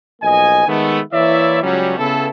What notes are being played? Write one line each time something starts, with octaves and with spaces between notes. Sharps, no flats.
B1 F3 A#3 D#5 G#5
D#3 G#3 A3 B3
E3 A#3 E4 C#5 D5 E5
C#2 F#3 G3 C#4
C#3 B3 E4 A4